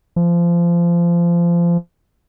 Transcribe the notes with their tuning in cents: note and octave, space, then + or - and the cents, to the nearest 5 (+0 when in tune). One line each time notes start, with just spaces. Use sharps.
F3 -25